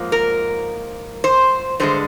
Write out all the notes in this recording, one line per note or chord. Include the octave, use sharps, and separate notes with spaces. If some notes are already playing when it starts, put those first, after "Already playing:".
Already playing: G#2 F3 A#3
A#4
C5
G2 D3 G#3 C5